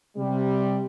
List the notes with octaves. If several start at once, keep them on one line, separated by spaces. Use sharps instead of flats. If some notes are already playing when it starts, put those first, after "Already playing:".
C3 G3